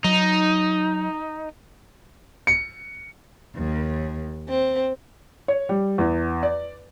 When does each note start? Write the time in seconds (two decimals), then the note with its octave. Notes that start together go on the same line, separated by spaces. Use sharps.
0.05 F#3 D#4
2.47 C#7
3.56 D#2
4.50 C4
5.48 C#5
5.69 G3
5.98 E2
6.43 D5